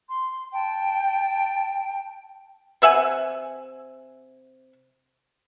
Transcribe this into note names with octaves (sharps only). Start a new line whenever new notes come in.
C6
G5 A5
C3 E5 F#5 G#5